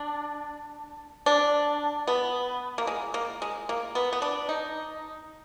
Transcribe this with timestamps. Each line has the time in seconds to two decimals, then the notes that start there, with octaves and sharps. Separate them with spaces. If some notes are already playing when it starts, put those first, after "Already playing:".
Already playing: D4
1.26 D4
2.07 B3
2.78 A#3
2.87 G#3
3.14 A#3
3.42 G#3
3.69 A#3
3.95 B3
4.13 B3
4.22 D4
4.49 D#4